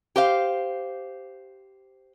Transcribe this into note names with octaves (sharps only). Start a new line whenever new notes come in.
G4 C5 F5